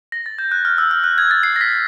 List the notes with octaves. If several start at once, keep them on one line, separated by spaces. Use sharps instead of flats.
A#6
A6
G6
F#6
F6
E6
F6
F#6
G#6
A6
C7
A#6
B6